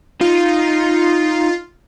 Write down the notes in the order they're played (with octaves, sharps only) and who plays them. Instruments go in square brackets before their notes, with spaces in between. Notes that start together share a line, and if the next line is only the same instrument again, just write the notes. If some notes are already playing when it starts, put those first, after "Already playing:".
[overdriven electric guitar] D#4 [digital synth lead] F4